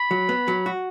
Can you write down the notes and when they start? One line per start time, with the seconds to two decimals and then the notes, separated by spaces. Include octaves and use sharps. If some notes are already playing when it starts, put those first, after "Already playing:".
Already playing: B5
0.11 F#3
0.29 B3
0.48 F#3
0.66 F#4